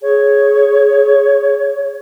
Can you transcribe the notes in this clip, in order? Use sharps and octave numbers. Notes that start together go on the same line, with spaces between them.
G#4 C#5